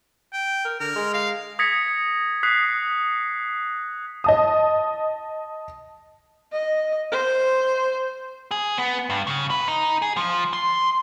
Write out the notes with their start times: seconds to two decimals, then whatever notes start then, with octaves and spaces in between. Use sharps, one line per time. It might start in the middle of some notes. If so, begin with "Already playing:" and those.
0.33 G5
0.65 A#4
0.80 D3 A#4
0.96 G#3
1.13 F5
1.59 D#6 G#6 A#6 B6 C#7
2.43 D#6 F#6 B6 C7
4.24 D#5 A5 D#6
6.52 D#5
7.12 C5
8.51 G#4
8.78 B3
9.10 G2
9.27 C#3
9.50 B4
9.68 D#4
10.02 G#4
10.17 F3
10.53 C6